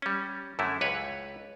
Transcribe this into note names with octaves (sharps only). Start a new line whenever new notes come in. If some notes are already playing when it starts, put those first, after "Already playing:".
G3 C#4
F#2 D3 A3 E4
C#2 B4 C#5